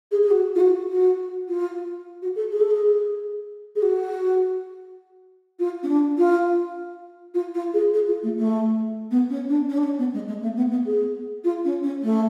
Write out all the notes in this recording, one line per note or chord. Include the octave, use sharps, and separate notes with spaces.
G#4
G#4
F#4
F4
F#4
F#4
F4
F#4
A4
G#4
A4
G#4
G#4
F#4
F4
C#4
D4
F4
F4
F4
G#4
G#4
F4
A3
A3
B3
C#4
D4
C#4
D4
C#4
B3
G#3
G#3
A3
B3
B3
G#4
F4
C#4
C#4
A3